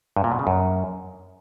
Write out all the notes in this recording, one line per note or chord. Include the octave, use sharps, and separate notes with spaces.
G2
A#2
B2
C#3
F#2